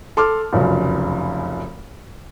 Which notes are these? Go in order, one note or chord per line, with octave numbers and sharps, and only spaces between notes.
A4 C6 D6 F6
F1 C#2 F#2